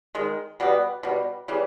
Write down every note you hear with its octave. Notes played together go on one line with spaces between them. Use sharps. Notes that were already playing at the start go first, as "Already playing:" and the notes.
D#3 G#3
B2 G3 B3
B2 G3
C#3 E3 G3